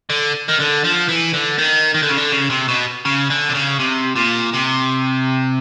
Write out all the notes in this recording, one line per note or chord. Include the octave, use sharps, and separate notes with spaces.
D3
D#3
D3
F3
E3
D3
D#3
D#3
D3
C#3
D3
C#3
C3
B2
C#3
D3
C3
C#3
C3
A#2
C3